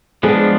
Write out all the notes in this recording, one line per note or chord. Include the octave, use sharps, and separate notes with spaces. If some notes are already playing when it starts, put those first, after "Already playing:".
F3 G#3 B3 D4 G#4